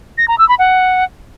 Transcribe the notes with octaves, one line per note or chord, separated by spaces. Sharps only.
A#6
A#5
E6
B5
F#5